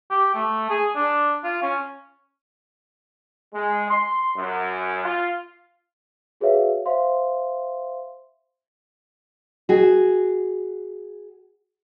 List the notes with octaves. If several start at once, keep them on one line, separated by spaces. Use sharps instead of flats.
G4
A3
G#4
D4
F4
C#4
G#3
C6
F#2
F4
F#4 G#4 B4 C#5 E5 F5
C5 E5 F5 C6
F#4 G#4